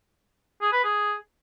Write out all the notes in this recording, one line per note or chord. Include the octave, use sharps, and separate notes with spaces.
G#4
B4
G#4